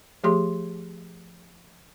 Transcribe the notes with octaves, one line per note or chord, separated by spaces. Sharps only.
F3 A3 G4 G#4 C6